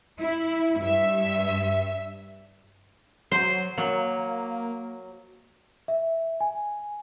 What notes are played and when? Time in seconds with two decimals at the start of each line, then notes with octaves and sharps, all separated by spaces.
0.20 E4
0.82 G2 E5
3.32 F#3 C5
3.78 F#3 A#3
5.88 E5
6.41 G#5